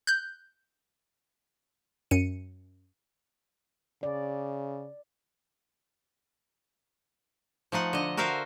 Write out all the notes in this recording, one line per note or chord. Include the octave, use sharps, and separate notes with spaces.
F#6 G6
F#2 C#7 D#7
C#3 D5
F3 A3 D#4 F#5
D3 D#5
F#4 A#4 C5 E5 F5